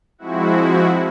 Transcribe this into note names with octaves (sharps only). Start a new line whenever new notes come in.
F3 G#3 C4 E4 F#4